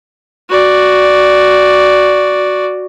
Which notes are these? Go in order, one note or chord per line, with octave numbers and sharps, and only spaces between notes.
F#4 D5